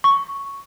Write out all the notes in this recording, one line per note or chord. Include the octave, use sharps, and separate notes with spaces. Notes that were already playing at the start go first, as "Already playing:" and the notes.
C#6